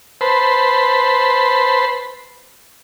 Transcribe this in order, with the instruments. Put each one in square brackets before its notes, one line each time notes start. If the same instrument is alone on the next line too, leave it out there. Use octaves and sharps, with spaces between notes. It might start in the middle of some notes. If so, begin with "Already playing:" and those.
[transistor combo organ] B4 C5 A5 B5 C6